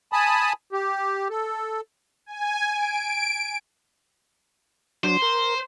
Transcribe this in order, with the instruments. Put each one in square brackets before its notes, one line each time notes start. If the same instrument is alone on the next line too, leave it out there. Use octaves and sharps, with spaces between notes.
[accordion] G#5 A5 B5 D#6
G4
A4
[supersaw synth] G#5
D7
[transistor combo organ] F#3 D4 [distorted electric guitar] C5
[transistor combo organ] A#4